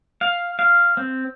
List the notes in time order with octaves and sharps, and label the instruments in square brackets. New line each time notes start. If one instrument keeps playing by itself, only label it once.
[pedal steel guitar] F5
F5
C4